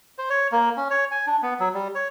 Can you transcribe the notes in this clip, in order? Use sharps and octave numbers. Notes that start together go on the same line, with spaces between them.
C5
C#5
A#3
C#4
C#5
G#5
D4
B3
F#3
G3
C#5